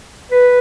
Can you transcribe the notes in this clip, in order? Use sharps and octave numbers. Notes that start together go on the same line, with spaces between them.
B4